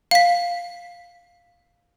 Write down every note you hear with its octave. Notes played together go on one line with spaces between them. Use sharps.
F5 B6